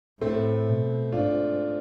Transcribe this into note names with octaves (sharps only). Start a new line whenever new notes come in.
A2 A3 C4
B2
G#2 D4 F4